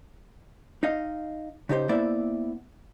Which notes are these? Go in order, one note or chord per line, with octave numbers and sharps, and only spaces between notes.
D#4 D#5 F5
C#3 D#4 G4 C5
A#3 B3 E4 C5 D5 E5